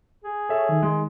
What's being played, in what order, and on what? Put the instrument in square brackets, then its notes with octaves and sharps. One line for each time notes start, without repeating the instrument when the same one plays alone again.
[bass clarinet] G#4
[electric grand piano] A4 E5 [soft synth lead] C#5
[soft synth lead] D#3
[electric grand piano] G#3